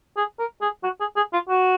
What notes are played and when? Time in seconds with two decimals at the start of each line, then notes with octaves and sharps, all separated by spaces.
0.17 G#4
0.39 A#4
0.61 G#4
0.83 F#4
1.00 G#4
1.17 G#4
1.33 F4
1.49 F#4